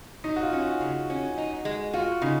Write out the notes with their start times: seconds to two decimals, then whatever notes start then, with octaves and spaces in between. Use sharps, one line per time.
0.24 F#3 D#4
0.36 F#4
0.43 F4
0.53 C#4
0.62 F#4
0.81 C#3
1.10 C#4
1.38 D#4
1.65 G#3
1.93 F4 F#4
2.22 C#3 D#4